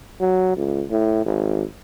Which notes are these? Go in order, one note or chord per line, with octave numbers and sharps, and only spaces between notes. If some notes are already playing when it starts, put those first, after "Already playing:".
F#3
C#2
A2
G#1